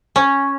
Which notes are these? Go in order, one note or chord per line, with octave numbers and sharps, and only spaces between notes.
C#4